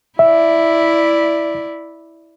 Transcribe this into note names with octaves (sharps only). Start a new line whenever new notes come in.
E4 D5 E5